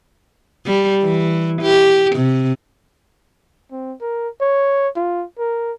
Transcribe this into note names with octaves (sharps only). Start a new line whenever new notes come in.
G3
E3
G4
C3
C4
A#4
C#5
F4
A#4